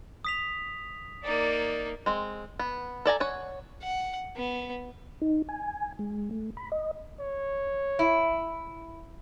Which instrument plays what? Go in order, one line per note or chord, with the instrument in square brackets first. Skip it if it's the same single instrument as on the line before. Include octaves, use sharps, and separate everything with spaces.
[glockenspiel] D#6 B6 F7
[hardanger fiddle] A#3 D#4 [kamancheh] D5
[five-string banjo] G#3 C4
B3
A4 D5 G#5 A#5
C#5 F#5 G#5
[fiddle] F#5
B3
[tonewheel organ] D#4
G#5
G#3
A3
B5
D#5
[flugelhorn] C#5
[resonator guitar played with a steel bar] E4